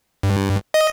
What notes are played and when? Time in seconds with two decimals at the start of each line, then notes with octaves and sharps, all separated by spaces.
0.23 G2
0.74 D#5